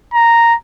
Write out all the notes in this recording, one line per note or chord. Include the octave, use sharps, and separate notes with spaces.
A#5